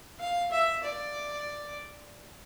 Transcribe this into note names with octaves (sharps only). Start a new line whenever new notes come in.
F5
E5
D5